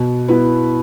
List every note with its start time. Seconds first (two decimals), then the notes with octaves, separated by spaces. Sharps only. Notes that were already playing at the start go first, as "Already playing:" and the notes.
Already playing: B2
0.28 B3 E4 B4